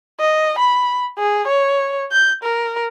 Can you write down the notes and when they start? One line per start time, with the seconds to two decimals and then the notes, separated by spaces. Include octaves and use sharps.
0.20 D#5
0.59 B5
1.18 G#4
1.48 C#5
2.12 G6
2.43 A#4